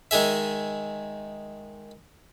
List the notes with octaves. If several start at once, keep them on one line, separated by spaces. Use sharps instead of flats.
D#3 G#3 G#4 E5